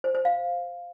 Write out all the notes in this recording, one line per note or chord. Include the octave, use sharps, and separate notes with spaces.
C5
C5
F5